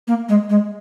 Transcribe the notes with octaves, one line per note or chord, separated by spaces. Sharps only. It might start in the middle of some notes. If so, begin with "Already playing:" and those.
A#3
G#3
G#3